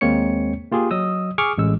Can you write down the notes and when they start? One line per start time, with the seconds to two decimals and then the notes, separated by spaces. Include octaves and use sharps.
0.01 D#2 G#3 A#3 C4 C#5 C#7
0.72 A#3 F4 G4 G#4
0.91 F#3 D#5 D#6 E6
1.38 G#4 C#6 D6 F6
1.58 A1 G#3 E6